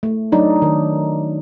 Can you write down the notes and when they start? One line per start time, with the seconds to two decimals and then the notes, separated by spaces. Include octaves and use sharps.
0.03 A3
0.32 F#3 D4 D#4 D5
0.62 D#3